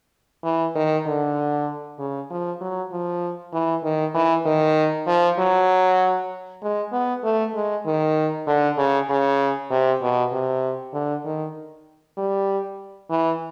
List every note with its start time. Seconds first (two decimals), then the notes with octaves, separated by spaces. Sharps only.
0.44 E3
0.76 D#3
1.06 D3
1.99 C#3
2.31 F3
2.61 F#3
2.92 F3
3.54 E3
3.84 D#3
4.15 E3
4.46 D#3
5.07 F3
5.39 F#3
6.63 G#3
6.93 B3
7.24 A3
7.55 G#3
7.86 D#3
8.48 D3
8.78 C#3
9.09 C#3
9.71 C3
10.02 B2
10.32 C3
10.94 D3
11.26 D#3
12.18 G3
13.11 E3